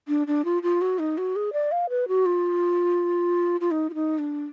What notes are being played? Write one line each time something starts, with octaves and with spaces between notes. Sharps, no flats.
D4
D4
F4
F4
F#4
D#4
F#4
G#4
D5
F5
B4
F#4
F4
F4
D#4
F4
D#4
D4